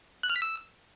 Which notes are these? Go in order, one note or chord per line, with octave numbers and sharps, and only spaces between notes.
F#6
F6
B6
E6